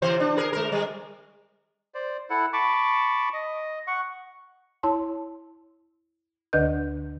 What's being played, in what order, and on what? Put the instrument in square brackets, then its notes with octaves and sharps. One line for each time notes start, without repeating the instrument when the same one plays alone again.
[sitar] C3 E3 C5
D4
G#4 A#4
G#3 A#4
G3
[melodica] C5 D5
E4 A4 F#5
A5 B5 C#6 D6
D#5
F#5 C#6
[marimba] E4 C#5 A5 C6
D2 D3 D4 B4 D#5 G6